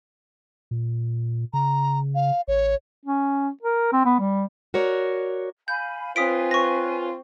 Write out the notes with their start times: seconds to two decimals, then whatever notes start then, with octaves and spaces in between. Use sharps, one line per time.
0.71 A#2
1.53 C#3 A#5
2.15 F5
2.48 A1 C#5
3.06 C#4
3.63 A#4
3.92 C4
4.05 B3
4.19 G3
4.74 F#4 A#4 C#5 D5
5.68 F5 G#5 B5 G6
6.16 C4 F4 B4 C#5 G#5 D#6 B6 D7
6.51 C#6 A#6